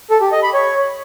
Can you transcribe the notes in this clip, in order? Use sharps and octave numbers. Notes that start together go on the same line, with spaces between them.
A4
G4
D#5
B5
C#5